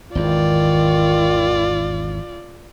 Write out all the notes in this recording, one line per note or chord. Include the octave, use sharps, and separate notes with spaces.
G#1 E2 D#3 F4 D5